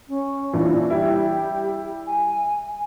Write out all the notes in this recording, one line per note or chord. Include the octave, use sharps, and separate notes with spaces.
C#4
A#2 E3 D4
G3 E4 G4
G#5